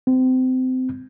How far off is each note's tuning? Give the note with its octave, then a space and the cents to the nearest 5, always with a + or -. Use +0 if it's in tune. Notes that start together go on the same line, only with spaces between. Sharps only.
C4 -25